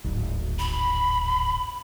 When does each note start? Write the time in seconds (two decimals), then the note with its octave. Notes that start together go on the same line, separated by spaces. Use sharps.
0.04 D1 G#1
0.59 B5